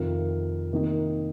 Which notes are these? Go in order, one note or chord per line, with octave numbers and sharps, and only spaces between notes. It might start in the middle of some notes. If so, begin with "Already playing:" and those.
Already playing: F2 C3 D#3 F4 A#4
C3 D#3 A#3 D#4